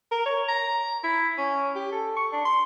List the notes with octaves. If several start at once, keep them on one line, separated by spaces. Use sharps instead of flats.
A#4
C#5
A#5
E4
C#4
G4
A4
C#6
D4
C6